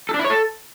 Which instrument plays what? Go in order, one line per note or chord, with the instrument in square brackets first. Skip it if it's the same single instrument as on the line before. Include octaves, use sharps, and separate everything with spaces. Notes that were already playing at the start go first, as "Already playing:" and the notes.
[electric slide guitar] A4
D4
E4
C#5
A4